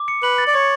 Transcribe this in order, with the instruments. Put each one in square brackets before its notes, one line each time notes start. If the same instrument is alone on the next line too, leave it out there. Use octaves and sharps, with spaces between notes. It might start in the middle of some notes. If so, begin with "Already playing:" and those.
Already playing: [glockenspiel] D6
C#7
[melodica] B4 [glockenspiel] F#7
[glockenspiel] A6
[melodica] D5
[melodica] C#5 [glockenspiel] D6